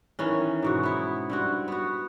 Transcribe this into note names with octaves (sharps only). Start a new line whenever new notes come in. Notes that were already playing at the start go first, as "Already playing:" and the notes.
D#3 E3 C#4
G#2 B2 F#4
B3 E4
G2 C4 F#4
B3 F#4